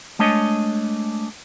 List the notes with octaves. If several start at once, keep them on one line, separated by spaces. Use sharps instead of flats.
G#3 A3 D4 C#5 D#5